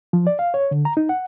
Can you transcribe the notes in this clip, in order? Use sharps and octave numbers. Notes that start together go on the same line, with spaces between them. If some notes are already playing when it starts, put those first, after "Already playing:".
F3
D5
F5
C#5
D3
A#5
D#4
F#5